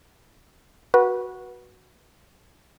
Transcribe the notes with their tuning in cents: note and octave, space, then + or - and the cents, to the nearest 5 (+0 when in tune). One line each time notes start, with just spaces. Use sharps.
F#4 +0 B4 -20